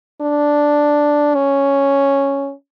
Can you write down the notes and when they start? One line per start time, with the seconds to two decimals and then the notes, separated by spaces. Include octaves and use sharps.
0.21 D4
1.35 C#4